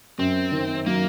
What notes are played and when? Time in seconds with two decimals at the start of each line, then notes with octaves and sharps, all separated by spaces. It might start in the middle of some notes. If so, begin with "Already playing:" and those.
0.19 F#2 C4
0.52 D#3
0.86 F#3 A#3